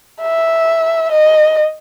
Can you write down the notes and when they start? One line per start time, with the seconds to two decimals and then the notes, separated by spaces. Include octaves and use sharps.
0.22 E5
1.12 D#5